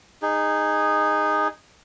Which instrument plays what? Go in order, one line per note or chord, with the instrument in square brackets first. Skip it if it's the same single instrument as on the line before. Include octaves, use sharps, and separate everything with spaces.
[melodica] D#4 G#4